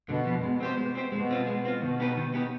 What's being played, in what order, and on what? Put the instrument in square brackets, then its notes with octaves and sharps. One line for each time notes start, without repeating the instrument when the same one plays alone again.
[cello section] B2 [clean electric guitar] D3
[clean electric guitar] F3 B3
[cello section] B2 [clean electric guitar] G#3
[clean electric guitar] C4 G4 C5
G#3
C4 G4 C5
[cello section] B2 [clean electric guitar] G#3
[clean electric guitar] C4 F4
G#3
C4 F4
[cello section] B2 [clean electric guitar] D#3
[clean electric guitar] B3 D#4 G4 B4
D#3
B3 D#4 G4 B4